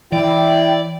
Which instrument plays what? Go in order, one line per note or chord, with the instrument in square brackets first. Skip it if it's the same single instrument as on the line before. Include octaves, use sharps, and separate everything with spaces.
[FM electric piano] E3 [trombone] E4 [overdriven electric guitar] D5 [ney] G5